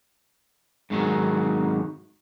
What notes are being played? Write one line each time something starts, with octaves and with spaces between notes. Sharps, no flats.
G#2 D#3 F#3